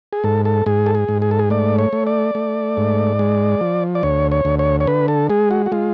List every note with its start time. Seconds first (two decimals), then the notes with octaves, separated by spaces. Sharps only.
0.13 G#4
0.24 G#2 A4
0.45 A4
0.66 G#2 G#4
0.86 A4
0.95 G#4
1.09 G#2
1.22 G#4
1.31 A4
1.39 G#4
1.50 A3 D5
1.79 C#5
1.93 A3
2.07 D5
2.35 A3
2.77 G#2
3.19 G#3
3.61 F3
3.95 D5
4.03 D2 C#5
4.32 C#5
4.45 D2
4.59 C#5
4.81 C#5
4.87 D3 B4
5.08 A4
5.30 G#3 G#4
5.51 F#4
5.66 F#4
5.72 G#3 F4